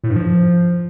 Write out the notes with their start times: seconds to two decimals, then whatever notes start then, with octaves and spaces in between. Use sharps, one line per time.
0.04 A2
0.10 G2
0.16 F3